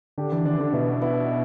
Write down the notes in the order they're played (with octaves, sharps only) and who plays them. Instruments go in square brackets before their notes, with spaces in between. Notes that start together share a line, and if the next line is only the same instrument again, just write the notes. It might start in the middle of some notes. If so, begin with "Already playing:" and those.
[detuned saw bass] D3 [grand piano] D4 G4
[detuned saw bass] E3 [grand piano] D4
[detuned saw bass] D3 [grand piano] D4
[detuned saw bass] E3
[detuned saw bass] D3 [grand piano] D4
[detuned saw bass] B2 [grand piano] B3 E4
[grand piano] B3 E4